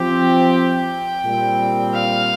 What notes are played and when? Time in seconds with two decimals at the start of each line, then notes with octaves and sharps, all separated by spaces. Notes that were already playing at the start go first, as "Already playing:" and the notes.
Already playing: F3 C4 G4 G5
0.54 G5
1.25 A#2 G3 C4
1.95 F5